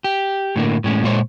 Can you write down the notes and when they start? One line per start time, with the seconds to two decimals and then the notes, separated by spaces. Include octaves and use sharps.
0.04 G4
0.56 A2 D3 A#3
0.84 A2 G#3 C#4
1.04 A#2 G#3 C5 C#5